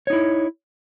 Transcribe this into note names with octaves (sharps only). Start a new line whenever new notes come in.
D#4 E4 C#5